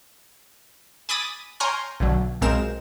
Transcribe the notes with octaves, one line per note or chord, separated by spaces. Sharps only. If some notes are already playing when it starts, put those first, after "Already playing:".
G#5 B5 D6 D#6 A6
C#5 G5 G#5 A#5 C6 F6
B1 D3 F#3
B1 A#2 G#3 C4 A#4 E7